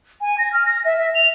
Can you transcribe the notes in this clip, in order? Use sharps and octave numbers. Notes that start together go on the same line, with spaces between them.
G#5
A#6
F6
A#6
E5
E5
F7